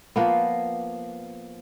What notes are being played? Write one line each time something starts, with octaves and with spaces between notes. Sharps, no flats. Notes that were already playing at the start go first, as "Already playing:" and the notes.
F3 A#3 B3